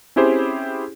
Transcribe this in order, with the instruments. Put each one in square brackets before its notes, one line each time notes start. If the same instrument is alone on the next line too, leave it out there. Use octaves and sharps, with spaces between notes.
[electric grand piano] C4 C#4 E4 G4 G#4 C5